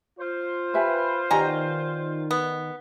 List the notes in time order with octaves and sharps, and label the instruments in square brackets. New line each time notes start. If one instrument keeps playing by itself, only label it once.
[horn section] F4 C5
[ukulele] G4 E5 G#5 [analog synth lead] B4
[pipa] B2 A#5 [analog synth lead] D#3 [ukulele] G4 D5 G#5
[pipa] B3